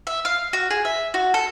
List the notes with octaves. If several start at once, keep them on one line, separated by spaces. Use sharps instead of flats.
E5
F5
F#4
G#4
E5
F#4
A4